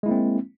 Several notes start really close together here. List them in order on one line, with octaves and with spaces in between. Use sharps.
G#3 E4 A#3 C4